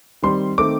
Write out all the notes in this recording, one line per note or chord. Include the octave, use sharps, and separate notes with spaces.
D#3 G3 C4 C6
D#3 A3 C4 D6